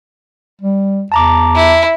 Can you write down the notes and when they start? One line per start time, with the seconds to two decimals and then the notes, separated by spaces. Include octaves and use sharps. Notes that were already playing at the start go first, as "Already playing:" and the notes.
0.61 G3
1.12 E2 A5 A#5 D6
1.55 E4